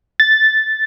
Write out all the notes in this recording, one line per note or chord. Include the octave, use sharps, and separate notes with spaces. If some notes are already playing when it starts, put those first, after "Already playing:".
A6